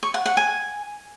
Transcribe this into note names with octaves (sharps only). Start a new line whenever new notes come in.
C#6
F#5
F#5
G#5